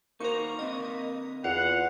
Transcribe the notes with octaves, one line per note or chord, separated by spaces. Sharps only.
A#3 D#4 F#4 A#4 C5 C#6
D3 C4 B4 D#5
E2 F4 F#5